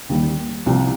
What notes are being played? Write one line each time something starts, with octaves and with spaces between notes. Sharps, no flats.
D#2 D#3 G3
C2 C3 F3